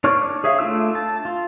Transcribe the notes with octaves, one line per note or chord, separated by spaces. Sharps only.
D4 C#5 D5 C#6 F6
G#4 C#5 E5 F5
A3 D4 F4 E6
A5
F4